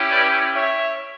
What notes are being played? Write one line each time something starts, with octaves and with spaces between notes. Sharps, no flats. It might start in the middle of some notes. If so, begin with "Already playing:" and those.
Already playing: C#4 E4 G4
B4 D5
C#5 E5